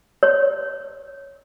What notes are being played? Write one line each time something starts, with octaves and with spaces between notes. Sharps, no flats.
C#5